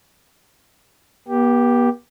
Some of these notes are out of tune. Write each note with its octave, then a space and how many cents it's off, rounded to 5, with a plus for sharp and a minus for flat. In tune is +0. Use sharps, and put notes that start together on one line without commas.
B3 -45 G4 +0